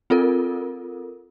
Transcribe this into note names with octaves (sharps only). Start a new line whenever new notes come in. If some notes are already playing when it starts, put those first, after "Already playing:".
C4 F4 A4 A#4